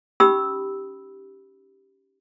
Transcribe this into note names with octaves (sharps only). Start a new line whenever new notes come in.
C#4 D#4 G4 B5 D#6 E6